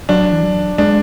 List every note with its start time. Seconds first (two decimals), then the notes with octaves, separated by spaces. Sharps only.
0.09 F#3 D4
0.33 E3
0.43 F#3
0.78 G#3 D4